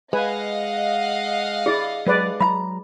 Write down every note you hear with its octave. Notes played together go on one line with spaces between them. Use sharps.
G#3 B4 D#5 F5 F#5 G#5
E4 G#4 D5
F#3 G#3 B4 D5
F#3 E5 A#5 B5